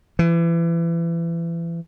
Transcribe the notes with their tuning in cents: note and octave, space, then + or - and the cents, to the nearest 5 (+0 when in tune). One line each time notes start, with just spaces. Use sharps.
E3 +30